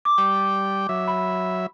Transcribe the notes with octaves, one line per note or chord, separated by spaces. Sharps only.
D6
G3 G5
F#3 E5
B5